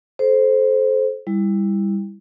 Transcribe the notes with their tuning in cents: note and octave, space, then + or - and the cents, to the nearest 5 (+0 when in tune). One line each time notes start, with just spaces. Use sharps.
A4 -30 C5 +0
G3 +20 E4 +0